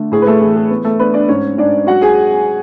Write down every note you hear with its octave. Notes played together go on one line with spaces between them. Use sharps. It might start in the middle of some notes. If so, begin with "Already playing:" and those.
Already playing: D3 A3
A2 G#4
B4
A3 A4
E3 G#4
G#4
B3
A3 A4
B3 D4 B4
D4 D5
G#2 C#4 C#5
G#2 D4 D5
F#3 F#4 F#5
G#4 G#5